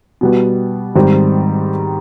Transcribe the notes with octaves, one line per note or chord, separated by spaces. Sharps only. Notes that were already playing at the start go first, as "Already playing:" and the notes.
B2 G3 B3
G#2 D#3 G3 C4